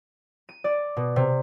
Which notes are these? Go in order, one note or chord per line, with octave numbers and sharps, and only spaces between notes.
D#7
D5
B2
C3